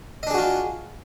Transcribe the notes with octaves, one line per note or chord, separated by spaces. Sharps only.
D4 F4 F#4 G#4 D#5